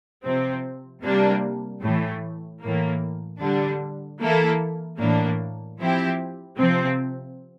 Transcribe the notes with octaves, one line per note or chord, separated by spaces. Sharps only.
C3 F3 C4
C3 G3 A#3 D4
A2 E3 A3
A2 E3 A#3
D3 G3 D4
E3 A#3 E4 A4
A2 E3 A#3 D4
F3 C4 E4 G4
C3 F3 C4